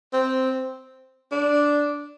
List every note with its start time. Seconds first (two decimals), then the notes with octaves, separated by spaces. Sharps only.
0.13 C4
1.32 D4